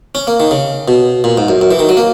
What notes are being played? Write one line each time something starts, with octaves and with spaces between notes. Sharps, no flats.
C#4
A#3
D#3
C#3
B2
A#2
G#2
F#2
F#2
E3
D#3
F#3
A#3